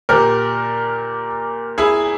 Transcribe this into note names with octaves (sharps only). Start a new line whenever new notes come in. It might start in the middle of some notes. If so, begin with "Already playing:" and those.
A#2 G4 A#4
E4 G#4